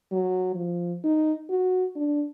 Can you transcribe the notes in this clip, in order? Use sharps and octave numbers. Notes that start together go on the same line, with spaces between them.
F#3
F3
D#4
F#4
D4